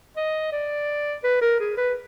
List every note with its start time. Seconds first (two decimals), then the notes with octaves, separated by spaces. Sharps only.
0.16 D#5
0.52 D5
1.24 B4
1.42 A#4
1.60 G#4
1.77 B4